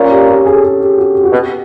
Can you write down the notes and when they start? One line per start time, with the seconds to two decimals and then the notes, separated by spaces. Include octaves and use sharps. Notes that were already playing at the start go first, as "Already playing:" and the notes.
Already playing: A#2 C#4
0.11 G4
0.28 G4
0.46 G#4
0.54 A4
0.63 G#4
0.80 G4
0.98 F#4
1.15 G4
1.24 F#4
1.32 B2 G4